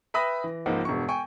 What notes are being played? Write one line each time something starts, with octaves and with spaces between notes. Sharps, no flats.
B4 E5 G5 B5 D#6 A#6
E3
C#2 G#2 F3 A#3 F#5
E1 G2 C#6
G5 G#5 C#6